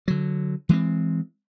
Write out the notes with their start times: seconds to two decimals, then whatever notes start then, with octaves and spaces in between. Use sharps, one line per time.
0.08 D3 F#3
0.69 E3 G#3 A#3 C4